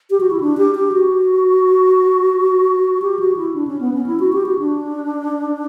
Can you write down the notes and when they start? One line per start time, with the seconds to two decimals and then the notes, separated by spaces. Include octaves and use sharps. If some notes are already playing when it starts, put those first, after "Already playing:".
0.10 G4
0.20 F#4
0.30 E4
0.40 D4
0.57 G4
0.75 G4
0.92 F#4
3.02 G4
3.19 F#4
3.37 E4
3.54 D4
3.67 C#4
3.81 B3
3.93 C#4
4.06 E4
4.20 F#4
4.33 G4
4.46 F#4
4.59 D4